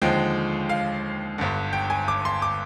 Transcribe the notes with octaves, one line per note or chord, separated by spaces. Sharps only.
D#2 D3 F3 G#3 G5
F5
G1 G2 D3
G5
G#5
D6
C6
D6